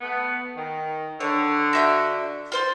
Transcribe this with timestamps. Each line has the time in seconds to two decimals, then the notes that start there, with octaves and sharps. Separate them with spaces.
0.01 A3 B3
0.56 D#3
1.20 D3 C#5
1.73 F#4 E5 G6
2.52 F4 C5 C6